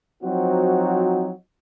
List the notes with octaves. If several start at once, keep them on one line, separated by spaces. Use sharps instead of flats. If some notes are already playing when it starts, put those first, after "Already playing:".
F3 F#3 C4 D#4 F#4